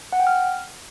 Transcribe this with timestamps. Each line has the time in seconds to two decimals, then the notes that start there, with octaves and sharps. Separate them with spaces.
0.13 F#5
0.20 G5
0.27 F6